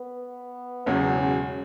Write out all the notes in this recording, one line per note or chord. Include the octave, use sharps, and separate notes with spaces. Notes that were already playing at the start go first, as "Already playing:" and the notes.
Already playing: B3
E1 E2 C#3 F#3 C#4
C#4